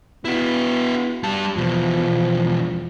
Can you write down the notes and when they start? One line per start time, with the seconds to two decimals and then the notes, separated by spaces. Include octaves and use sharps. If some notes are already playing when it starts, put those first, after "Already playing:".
0.25 B3 E4 F#4
1.24 G3 A5
1.57 E2 B2 F3